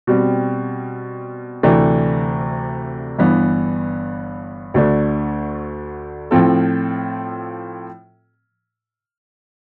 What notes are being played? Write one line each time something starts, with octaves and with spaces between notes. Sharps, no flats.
B2 G3 C4
D2 C3 E3 A3 D4
G1 G2 E3 B3 D4
D2 D3 A3 D4
A2 F3 C4 F4 A4